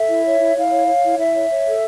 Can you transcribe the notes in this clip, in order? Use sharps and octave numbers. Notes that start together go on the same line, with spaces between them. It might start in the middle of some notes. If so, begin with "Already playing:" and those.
Already playing: A4 E5
E4
C#5
E4
E4 F5
C#5
C#5
E4
E4 E5
C#5
C#5
A4